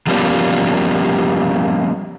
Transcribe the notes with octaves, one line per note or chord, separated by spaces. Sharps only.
F3 G3 A#3 B3 C#4